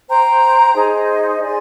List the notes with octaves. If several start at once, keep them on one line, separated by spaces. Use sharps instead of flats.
C5 G5 A#5
D#4 G#4 C5 D#5
G#4 D5 G#5 C6